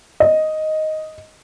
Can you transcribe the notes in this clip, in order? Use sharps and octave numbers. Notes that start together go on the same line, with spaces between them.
D#5